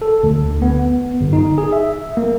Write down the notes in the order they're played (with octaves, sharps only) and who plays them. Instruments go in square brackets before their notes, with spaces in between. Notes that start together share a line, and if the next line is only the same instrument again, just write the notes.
[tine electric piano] A4
D2
B3
G1
D#4
G#4
E5
A#3